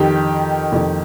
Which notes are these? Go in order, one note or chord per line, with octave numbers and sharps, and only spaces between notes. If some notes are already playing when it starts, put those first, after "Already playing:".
Already playing: F2 D#3 G4
F2 D#3